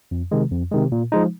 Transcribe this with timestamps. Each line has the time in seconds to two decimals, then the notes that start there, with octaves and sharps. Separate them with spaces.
0.11 F2
0.32 C3 D#3 G#3
0.52 F2
0.71 C3 D#3 G#3
0.92 A#2
1.12 F3 G#3 D#4